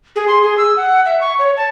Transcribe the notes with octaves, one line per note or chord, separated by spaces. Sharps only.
G#4
C6
G#4
E6
F#5
E5
C#6
C#5
A5